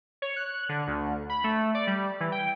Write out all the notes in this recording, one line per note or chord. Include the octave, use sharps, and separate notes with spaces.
C#5
F#6
D3
D2
B5
A3
D5
G3
E3
G5